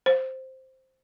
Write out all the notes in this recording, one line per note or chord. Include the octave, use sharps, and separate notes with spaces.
C5